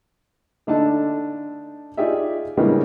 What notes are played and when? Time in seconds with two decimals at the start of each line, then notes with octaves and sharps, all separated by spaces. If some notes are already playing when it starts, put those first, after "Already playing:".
0.67 D3 A3 D4 D#4 A4 A5
1.97 D#4 F4 G4 G#4 D5 E5
2.57 C#3 E3 G3 G#3 A#3 B3